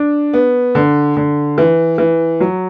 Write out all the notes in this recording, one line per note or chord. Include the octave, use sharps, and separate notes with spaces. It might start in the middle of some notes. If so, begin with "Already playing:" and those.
Already playing: D4
B3
D3
D3
E3
E3
F#3